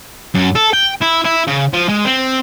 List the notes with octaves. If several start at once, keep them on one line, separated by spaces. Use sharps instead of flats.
F#2
A4
G5
E4
E4
C#3
F3
G#3
C4